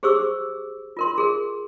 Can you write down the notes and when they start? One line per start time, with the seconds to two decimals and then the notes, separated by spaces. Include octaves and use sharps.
0.03 G4 G#4 C5 C#6 D6 E6
0.97 F4 A#4 C6
1.18 G#4 A#4